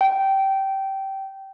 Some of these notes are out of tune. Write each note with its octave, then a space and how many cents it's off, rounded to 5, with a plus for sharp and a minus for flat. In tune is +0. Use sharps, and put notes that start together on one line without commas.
G5 -20